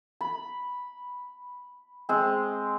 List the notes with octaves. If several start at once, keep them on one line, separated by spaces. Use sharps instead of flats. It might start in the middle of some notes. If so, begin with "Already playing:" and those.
B5
G#3 C4